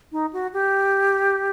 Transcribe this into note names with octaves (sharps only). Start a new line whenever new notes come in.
D#4
F#4
G4